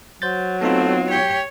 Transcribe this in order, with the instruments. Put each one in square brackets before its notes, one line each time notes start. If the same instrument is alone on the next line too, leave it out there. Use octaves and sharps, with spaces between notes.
[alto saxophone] F#3 [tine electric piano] C5 G6 A6
[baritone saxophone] A3 [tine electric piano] B3 D#4 F4 [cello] C4
[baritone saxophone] G4 [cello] C#5